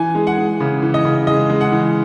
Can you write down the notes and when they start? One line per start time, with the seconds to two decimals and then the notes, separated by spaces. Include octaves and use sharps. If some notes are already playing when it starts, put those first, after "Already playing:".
Already playing: E3 G#5
0.15 G#3
0.27 F#5
0.38 G#3
0.60 C#3
0.82 E3
0.94 D#5
1.05 C#3
1.27 G#3 D#5
1.50 G#3
1.61 F#5
1.72 E3